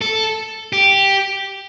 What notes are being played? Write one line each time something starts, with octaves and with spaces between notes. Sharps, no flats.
A4
G4